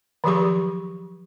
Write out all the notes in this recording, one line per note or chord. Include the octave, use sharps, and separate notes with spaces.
D#3 F3 F#3 G4 G#4 C#6